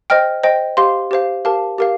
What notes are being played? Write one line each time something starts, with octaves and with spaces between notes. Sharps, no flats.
C5 D#5 G5 F6
C5 D#5 G5
G4 C5 F5 C6
G4 C5 F5
G4 A#4 F5 A5
G4 A#4 F5